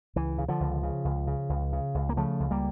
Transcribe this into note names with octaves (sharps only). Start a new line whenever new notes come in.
C#2 E3
C#3
D3 F3
C#2
C#3
C#2
C#3
C#2
C#3
C#2
A#3
C#3 F3 A3
C#2
G3 A#3